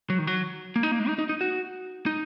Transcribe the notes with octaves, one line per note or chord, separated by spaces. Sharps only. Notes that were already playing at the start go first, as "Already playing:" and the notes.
F#3
D#3
F#3
A#3
D#4
A#3
G#3
D#4
D#4
D#4
F#4
D#4